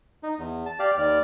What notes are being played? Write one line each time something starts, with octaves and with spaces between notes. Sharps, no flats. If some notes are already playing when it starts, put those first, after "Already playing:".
D#4
E2
A5
G4 D5 F5
D#2 D5 F6